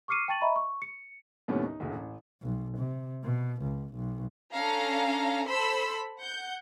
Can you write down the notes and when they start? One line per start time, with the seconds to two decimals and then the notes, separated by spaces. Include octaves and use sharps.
0.08 C#6 D6 F6 C7 C#7 D#7
0.28 G5 A5 C#6 A6 D#7 F#7
0.41 D#5 E5 A#5 B5 C#6
0.56 C#6
0.82 C#7
1.48 D#2 A2 C3 G3 B3 C#4
1.65 D#4
1.80 F#1 D2
1.91 A1
2.43 B1
2.78 C3
3.24 B2
3.63 C#2
3.95 B1
4.52 C#4 D4 A4 F5 A#5
5.49 A4 C5 B5 C6 E6
6.18 F#5 G6